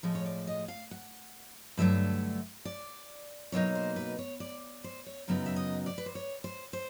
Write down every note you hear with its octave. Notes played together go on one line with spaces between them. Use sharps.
A2 F3 G#3
C#5
D5
D#5
F5
F#5
G2 D3 F#3 A3 E5
D5
B2 F#3 A#3 D#4 C#5
C5
B4
C#5
D5
C5
C#5
F#2 C#3 F#3 B3 D#4
E5
D#5
D5
B4
C5
C#5
C5
C5